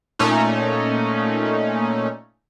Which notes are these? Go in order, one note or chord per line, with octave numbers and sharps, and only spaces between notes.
A#2 A3 C#4 D#4